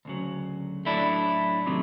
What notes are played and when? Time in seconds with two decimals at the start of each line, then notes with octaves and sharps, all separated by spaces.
0.05 D2 C#3 F#3
0.85 A2 F#3 A3 D4 E4
1.66 C3 D#3 F#3 A3